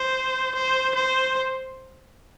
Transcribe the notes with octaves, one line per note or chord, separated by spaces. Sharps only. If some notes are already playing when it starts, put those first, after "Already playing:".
Already playing: C5
C5
C5